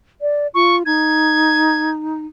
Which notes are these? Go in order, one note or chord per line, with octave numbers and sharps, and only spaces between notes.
D5
F4 C#6
D#4 G#6